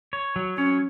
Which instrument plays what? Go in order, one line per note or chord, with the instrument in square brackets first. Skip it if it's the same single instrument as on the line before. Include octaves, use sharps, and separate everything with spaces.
[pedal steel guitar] C#5
F#3
[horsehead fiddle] C#4 [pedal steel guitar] C#5